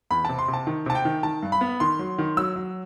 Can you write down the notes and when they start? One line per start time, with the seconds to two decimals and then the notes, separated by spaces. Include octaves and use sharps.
0.10 E2 B5
0.25 C3 A5
0.39 C6
0.48 C3
0.54 A5
0.67 D#3
0.86 C3 A5
0.95 G5
1.05 D#3
1.23 D#3 A5
1.43 G2
1.52 B5
1.61 B3
1.80 D#3 C6
1.99 F#3
2.18 D#3
2.37 F#3 E6
2.56 F#3